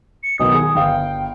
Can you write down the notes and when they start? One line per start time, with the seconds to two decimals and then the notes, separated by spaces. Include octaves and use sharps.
0.23 C#7
0.40 B1 D#3 B3 D#6
0.54 G#4
0.75 G1 F5 G5